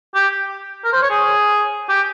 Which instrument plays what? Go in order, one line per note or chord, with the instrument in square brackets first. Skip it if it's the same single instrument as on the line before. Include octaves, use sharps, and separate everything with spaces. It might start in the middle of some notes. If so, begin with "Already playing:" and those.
[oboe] G4
A#4
C5
C#5
G#4
G4